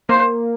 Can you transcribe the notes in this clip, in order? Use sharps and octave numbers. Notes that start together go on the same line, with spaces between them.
A#3 C5